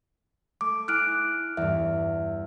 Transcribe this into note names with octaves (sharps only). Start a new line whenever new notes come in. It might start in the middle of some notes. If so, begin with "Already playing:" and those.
A3 D6
E4 G#5 D#6 F6 F#6 D7
E2 G2 E5